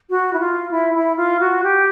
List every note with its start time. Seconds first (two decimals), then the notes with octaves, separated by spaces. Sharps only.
0.10 F#4
0.33 E4
0.40 F4
0.71 E4
0.95 E4
1.17 F4
1.40 F#4
1.63 G4